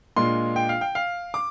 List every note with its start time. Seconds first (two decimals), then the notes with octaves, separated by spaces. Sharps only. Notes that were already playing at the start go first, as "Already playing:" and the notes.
0.16 A#2 G#3 D4 F4 C6
0.56 G5
0.69 F5
0.81 G5
0.95 F5
1.34 D6